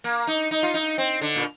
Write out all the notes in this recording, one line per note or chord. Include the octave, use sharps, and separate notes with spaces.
A#3
D#4
D#4
F4
D#4
C4
D3
A#2